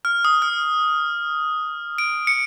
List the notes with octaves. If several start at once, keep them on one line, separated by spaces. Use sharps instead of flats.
F6
D#6
F6
D7
C#7